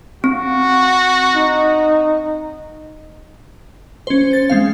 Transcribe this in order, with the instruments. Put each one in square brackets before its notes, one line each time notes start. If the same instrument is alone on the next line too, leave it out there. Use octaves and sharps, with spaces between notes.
[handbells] C4 [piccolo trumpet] F#4
[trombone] D#4
[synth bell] C#4 C5
A6
G#3 C4 F5